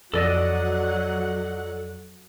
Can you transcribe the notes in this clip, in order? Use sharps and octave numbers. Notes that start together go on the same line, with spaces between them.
F2 F#3 A4 D5 D#5 F#5